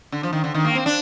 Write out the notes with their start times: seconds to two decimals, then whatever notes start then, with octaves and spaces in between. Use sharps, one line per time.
0.12 D3
0.23 F3
0.33 D#3
0.44 D3
0.54 D#3
0.65 A#3
0.75 C4
0.86 D4